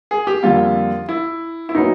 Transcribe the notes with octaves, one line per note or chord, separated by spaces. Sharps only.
G#4
G4
F2 D3 G3 A#3 F4
E4
E4
A#2 F#3 B3 D#4